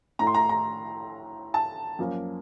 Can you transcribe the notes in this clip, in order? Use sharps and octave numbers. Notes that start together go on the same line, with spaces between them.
A2 A3 A#5
C6
A#5
A#5
A5
F#2 F3 A#3